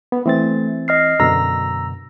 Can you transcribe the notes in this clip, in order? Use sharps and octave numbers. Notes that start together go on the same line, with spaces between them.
B3
E3 A3 C4 A6
D#5 F6 C7
F#2 B2 D3 A#5 E6 A#6